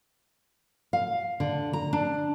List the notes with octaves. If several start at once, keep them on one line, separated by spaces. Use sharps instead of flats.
F5
D3
A#5
D4